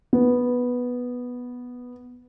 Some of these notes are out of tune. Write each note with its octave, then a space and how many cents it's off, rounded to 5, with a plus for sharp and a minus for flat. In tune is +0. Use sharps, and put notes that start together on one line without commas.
B3 -5